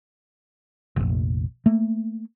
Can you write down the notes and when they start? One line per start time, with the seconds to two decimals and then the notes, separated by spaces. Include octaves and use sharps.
0.96 F1 A#1
1.66 A3 A#3